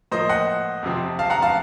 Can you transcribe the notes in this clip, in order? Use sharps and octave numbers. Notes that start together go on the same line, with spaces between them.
A2 F3 A#3 C5 D#5
D#5 F#5
F2 C3 F3 C4
F5 A5
F#5 A#5
F5 A5